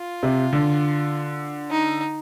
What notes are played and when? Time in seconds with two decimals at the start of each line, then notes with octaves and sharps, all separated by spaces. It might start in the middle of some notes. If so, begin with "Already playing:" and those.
Already playing: F4
0.23 C3
0.53 D3
1.71 D#4